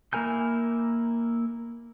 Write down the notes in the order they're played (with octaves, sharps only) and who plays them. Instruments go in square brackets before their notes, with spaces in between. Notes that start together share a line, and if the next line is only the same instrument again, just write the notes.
[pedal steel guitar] A#3 E4 A#4 G#5 G6